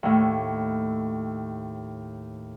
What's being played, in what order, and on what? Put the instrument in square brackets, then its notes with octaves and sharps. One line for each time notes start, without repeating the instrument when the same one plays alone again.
[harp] D#2 A2